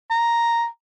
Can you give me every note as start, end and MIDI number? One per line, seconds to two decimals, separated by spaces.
0.11 0.66 82